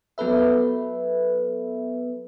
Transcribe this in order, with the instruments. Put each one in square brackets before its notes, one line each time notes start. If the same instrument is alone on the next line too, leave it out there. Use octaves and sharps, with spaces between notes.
[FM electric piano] F#3 B3 A4 B4 E5